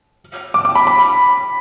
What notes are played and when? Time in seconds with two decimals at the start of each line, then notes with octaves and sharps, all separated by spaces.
0.54 D6
0.65 D6
0.75 B5
0.87 B5